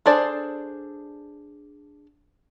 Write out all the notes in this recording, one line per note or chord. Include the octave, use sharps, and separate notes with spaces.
D4 G#4 A4 C5 D5